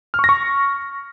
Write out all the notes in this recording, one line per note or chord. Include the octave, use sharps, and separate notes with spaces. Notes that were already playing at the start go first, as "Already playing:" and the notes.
F6
C#6
A#6
C#6